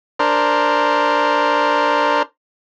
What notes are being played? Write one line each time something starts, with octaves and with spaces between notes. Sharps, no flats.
D4 A#4 C5